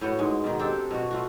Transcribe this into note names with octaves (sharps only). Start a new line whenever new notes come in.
A2 B3 F#4 F#5
G#2 G#3
B2 D#3
C4 D4 G4 A4
B2 F#4
A3 F4 F#4